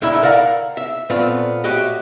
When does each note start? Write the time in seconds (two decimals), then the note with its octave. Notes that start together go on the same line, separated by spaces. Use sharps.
0.02 C#2 A#2 D3 E4 E5 B5
0.22 A#4 D5 F5 F#5 A5 A#5
0.77 E5
1.10 A#2 A3 B3 C4 F4
1.64 A2 F#4 G4 D#5